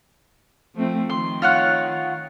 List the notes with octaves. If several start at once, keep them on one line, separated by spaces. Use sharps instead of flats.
F3 A3 C4
D#3 C6
F4 C#5 F#5